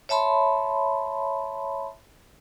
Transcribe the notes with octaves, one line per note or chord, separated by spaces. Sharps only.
C#5 E5 A5 B5 C6